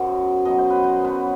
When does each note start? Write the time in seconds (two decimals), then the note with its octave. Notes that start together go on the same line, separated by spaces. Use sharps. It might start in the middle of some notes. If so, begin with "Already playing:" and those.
Already playing: F#2 B2 F#3 C5 D#5
0.45 B2 F#3 D#5
0.58 C5
0.70 B4
0.84 C5
1.04 B2 F#3 B4